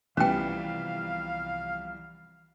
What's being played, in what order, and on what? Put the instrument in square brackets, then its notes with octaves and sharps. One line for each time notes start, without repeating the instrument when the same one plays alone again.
[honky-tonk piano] C2 G3 [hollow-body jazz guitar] E3 F3 B3 [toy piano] C#4 G5 [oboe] F5